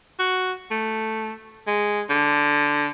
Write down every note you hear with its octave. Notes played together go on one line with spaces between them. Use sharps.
F#4
A3
G#3
D3